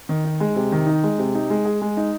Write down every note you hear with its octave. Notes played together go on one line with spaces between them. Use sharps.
D#3
D#4
G#3
C3
D#3
D#4
G#3
C3
D#4
G#3
G#4
G#3
D#4